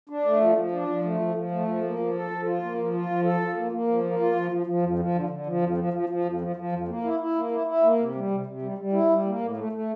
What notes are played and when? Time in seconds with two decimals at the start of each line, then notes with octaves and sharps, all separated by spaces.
0.09 D4
0.25 A3
0.41 F3
0.56 F3
0.72 D4
0.88 F3
1.04 A3
1.20 F3
1.35 F3
1.51 A3
1.67 F3
1.83 A#3
1.99 F3
2.14 A4
2.31 F3
2.46 F4
2.62 A#3
2.78 F3
2.93 F4
3.09 F3
3.24 A4
3.40 F3
3.57 A#3
3.72 A#3
3.88 F3
4.04 A#3
4.20 F4
4.35 F3
4.52 F3
4.66 F3
4.83 F2
4.99 F3
5.14 D3
5.30 D3
5.46 F3
5.62 F2
5.77 F3
5.93 F3
6.09 F3
6.25 F2
6.41 F3
6.56 F3
6.72 F2
6.88 A#3
7.04 E4
7.20 E4
7.35 A#3
7.52 E4
7.67 E4
7.83 A#3
7.99 C3
8.15 G3
8.31 C3
8.46 C3
8.62 G3
8.78 G3
8.93 E4
9.09 G3
9.25 A#3
9.40 A2
9.57 A3
9.72 A3